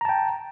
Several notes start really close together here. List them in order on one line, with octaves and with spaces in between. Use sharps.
A#5 A5 G5